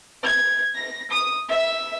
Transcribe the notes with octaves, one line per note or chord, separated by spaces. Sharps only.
G#6
A#6
D#6
E5